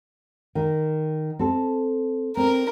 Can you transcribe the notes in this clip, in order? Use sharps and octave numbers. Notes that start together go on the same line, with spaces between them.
D#3
C4 A4
C4 A#4